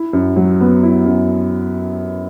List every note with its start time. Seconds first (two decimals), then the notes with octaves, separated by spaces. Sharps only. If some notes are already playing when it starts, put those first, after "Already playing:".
Already playing: E4
0.13 F#2
0.36 F#3
0.60 B3
0.83 E4
1.06 F#2